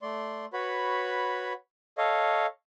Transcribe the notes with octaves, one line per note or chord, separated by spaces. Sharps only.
A3 D5 C6
F#4 B4 C#5 B5
A4 C#5 D#5 F5